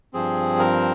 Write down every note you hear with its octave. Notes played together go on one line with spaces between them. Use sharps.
G2 F3 C4 G#4
A#4